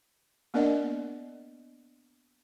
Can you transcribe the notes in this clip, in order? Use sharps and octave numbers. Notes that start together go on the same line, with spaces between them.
A#3 B3 D4 A#4 D5 D#5